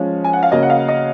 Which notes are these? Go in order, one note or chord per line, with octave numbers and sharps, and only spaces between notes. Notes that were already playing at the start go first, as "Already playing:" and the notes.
Already playing: F3 G#3 C#4
G#5
F#5
F5
C#3 F#3 A#3 C#4 D#5
F#5
F5
D#5